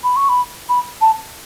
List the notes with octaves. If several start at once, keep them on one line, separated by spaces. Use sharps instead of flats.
B5
C#6
B5
B5
A5